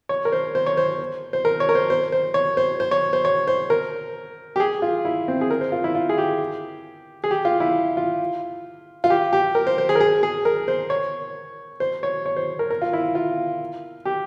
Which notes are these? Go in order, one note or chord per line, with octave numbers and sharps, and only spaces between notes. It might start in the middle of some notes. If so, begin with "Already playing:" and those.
C#5
A#4
C5
C5
C#5
C5
C5
A#4
C#5
A#4
C5
C5
C5
C#5
C5
C5
C#5
C5
C#5
C5
A#4
G4
G#4
F4
E4
C4
G#4
A#4
C5
F4
E4
F4
G#4
G4
G#4
G4
F4
E4
F4
F4
G4
G4
A#4
C5
C5
G#4
A#4
G#4
G#4
A#4
C5
C#5
C5
C#5
C#5
C5
A#4
A#4
F4
E4
F4
G4